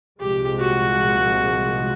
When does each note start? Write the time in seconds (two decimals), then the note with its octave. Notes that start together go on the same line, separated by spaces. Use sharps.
0.20 C2 A#2 F3 G#3 G4
0.60 F#4